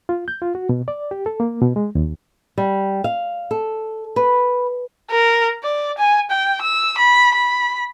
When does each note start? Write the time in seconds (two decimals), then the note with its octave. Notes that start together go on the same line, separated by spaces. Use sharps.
0.09 F4
0.28 G6
0.42 F4
0.55 F#4
0.69 B2
0.88 D5
1.11 G4
1.26 A4
1.40 A#3
1.62 B2
1.76 G#3
1.95 D#2
2.58 G3
3.04 F5
3.51 A4
4.16 B4
5.11 A#4
5.64 D5
5.98 G#5
6.31 G5
6.62 E6
6.98 B5
7.34 B5